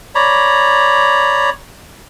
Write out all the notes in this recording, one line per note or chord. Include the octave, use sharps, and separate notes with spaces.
C#5 D5 A#5 B5